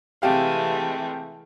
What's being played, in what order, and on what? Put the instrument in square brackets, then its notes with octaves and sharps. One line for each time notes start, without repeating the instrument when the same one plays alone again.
[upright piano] C3 G4 F5 [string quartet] E3 G#3 A3